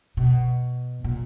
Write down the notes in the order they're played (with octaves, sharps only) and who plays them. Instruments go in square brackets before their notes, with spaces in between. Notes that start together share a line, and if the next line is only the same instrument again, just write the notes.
[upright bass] B2
A#2